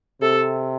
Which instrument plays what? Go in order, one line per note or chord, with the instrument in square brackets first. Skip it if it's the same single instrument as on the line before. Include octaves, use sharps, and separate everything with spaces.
[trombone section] C3 [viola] A4